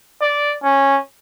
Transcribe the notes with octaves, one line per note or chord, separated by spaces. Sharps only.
D5
C#4